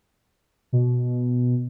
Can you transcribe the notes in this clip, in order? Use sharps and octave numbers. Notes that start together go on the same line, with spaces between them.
B2